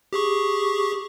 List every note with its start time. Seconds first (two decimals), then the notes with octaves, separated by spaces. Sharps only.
0.13 G4 G#4 C#6